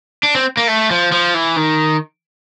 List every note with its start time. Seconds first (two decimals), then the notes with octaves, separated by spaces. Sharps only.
0.23 D4
0.35 C4
0.57 A#3
0.68 A3
0.91 F3
1.12 F3
1.34 E3
1.56 D#3